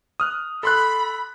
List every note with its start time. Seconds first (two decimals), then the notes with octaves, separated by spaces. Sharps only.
0.20 D#6 F6 F#6
0.63 A4 B5 C6 F#6